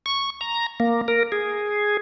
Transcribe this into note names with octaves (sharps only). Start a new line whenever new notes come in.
C#6
A#5
A#3
A#4
G#4